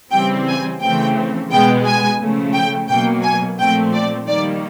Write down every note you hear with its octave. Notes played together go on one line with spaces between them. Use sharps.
C#3 E3 G3 C4 G5
G#5
C#3 E3 A3 C4 G5
B2 G#3 B3 G5
G#5
C#3 F3 A3
G5
B2 F#3 A#3 G5
G#5
A#2 F3 A3 C4 G5
D5
D#3 G3 A#3 D5